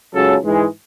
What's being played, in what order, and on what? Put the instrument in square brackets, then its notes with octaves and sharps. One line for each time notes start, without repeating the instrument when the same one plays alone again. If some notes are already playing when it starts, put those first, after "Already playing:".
[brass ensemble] C#2 C#3 F#3 A4
G#2 E3 G#3